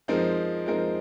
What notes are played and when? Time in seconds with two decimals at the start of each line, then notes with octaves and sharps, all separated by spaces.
0.08 F3 G#3 C4 D#4 A#4
0.66 F3 G#3 C4 D#4 A#4